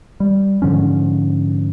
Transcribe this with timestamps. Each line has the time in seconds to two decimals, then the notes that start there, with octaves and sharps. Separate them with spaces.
0.20 G3
0.62 G#2 D3 F3 C#4